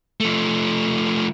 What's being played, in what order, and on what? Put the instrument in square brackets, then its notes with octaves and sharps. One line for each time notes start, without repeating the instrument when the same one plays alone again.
[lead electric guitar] F3 A3